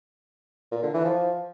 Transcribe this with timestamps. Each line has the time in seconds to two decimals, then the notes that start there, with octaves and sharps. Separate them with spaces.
0.72 A#2
0.83 D3
0.94 E3
1.05 F3